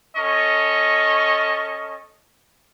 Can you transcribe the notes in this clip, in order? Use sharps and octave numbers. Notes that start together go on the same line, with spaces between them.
C#4 A4 D#5 C#6